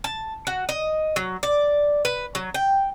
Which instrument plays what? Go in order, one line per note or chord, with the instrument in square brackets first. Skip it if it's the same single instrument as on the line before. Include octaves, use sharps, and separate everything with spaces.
[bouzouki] A5
F#4
D#5
F#3
D5
B4
F#3
G5